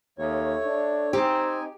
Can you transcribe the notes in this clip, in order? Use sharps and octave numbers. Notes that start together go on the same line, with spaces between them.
D#2 A3 C#5
D4
C4 D#4 G4 G#5